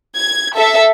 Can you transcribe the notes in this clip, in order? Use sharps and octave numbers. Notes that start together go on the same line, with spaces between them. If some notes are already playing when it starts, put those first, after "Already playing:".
G#6
A4 E5